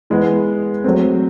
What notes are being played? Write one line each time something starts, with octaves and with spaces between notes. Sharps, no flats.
E3 G#3 B3
F#3 A3 C4